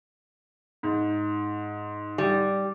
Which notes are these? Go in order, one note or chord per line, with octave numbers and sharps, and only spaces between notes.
G#2
G3